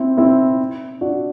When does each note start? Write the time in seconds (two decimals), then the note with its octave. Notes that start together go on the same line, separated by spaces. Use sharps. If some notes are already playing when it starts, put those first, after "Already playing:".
Already playing: C4 E4
0.17 C4 E4
1.01 D4 F#4